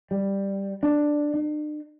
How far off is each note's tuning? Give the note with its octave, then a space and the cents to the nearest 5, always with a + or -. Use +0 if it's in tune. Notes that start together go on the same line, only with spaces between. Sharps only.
G3 +5
D4 +5
D4 +45